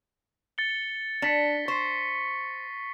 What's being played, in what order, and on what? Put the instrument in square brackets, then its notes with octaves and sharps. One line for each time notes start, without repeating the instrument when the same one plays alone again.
[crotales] A6 C#7 G7
[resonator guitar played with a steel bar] D4 [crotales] A#6 B6 C#7
[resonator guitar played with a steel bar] C5 [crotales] C#6 C7